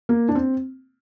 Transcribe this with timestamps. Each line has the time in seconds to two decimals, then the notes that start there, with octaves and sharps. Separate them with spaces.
0.09 A#3
0.29 D4
0.35 C4